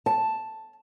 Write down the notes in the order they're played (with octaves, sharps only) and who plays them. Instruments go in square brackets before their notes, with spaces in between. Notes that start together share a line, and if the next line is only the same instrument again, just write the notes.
[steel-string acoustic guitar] A5